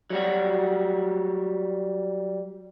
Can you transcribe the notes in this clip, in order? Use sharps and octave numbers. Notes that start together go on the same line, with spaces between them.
F#3 G3 F#4